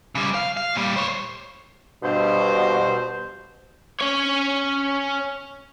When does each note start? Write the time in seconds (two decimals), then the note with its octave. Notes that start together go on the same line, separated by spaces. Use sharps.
0.15 C#3 G3
0.35 F5
0.57 F5
0.75 A#2 G3
0.96 C5 C#5
2.03 G2 B2 C5
4.01 C#4 C#5